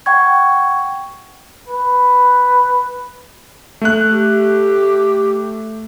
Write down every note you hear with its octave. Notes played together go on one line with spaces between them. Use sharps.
F#5 G5 C#6 G#6
B4
A3 F#6
G4